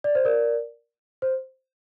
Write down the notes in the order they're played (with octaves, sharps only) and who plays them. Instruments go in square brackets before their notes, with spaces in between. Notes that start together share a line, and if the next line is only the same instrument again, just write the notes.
[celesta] D5
C5
A#4 D5
C5